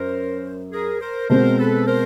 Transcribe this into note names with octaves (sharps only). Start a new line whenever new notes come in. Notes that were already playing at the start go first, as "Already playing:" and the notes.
Already playing: F#2 A#4 C5
G#4 A#4
A#4 C5
B2 G#3 C4 A#4 C5
A4 B4
A#4 C5